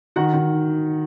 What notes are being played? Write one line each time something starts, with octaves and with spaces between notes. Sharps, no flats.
D#3 F#4 F#5
D#3